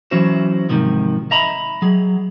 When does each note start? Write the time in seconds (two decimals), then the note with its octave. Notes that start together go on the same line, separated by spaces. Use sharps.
0.11 E3 F#3 C#4 E4 F#4 C5
0.69 G#2 C3 D#3 F3
1.31 D#5 E5 A#5 B5
1.82 F#3 G#4